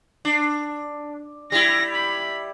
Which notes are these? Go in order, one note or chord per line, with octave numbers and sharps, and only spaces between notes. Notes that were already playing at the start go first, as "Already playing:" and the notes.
D4
G3 E4 A#6
B5